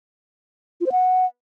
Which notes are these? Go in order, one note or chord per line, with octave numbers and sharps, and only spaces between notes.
F4
C5
F#5